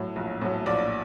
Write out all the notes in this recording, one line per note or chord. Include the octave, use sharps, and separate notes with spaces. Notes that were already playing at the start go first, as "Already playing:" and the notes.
Already playing: A2 F#3
A#1
A2 F#3
A#1 D5